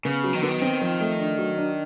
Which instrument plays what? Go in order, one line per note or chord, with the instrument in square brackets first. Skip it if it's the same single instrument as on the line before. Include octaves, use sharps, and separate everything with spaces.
[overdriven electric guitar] C#3 [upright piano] B3
[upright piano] F#3
[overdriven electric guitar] D#3
[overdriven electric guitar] D3 [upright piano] B3
[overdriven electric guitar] D#3
[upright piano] C4
F3
A3
D4
F#3
D4